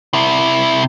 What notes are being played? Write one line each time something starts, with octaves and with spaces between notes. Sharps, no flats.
C3 E4